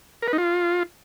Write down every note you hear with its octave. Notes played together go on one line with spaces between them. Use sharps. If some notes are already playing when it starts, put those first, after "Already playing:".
A#4
B4
D#4
F4